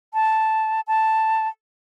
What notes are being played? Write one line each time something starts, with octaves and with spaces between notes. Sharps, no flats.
A5
A5